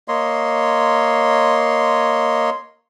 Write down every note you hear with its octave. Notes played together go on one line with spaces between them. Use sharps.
A#3 C#5 D#5 C6